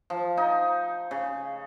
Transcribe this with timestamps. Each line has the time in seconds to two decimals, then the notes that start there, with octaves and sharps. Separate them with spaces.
0.10 F3
0.37 D#4
1.11 C#3